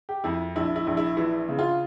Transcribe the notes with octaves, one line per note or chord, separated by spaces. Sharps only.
G4
F2 E4
A#1 E4
E4
A#1
E4
E3 E4
C#3
F4